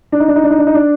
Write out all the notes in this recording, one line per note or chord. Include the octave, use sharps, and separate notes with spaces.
D4
D#4
D4
D#4
D4
D#4
D4
D#4
D4